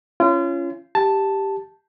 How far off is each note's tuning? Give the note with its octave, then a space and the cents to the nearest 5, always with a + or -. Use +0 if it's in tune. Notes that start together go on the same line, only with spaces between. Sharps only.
C#4 +0 F4 -35
G4 +0 A5 +0